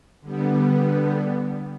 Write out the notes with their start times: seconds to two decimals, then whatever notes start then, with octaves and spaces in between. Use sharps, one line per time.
0.21 D3 G3 B3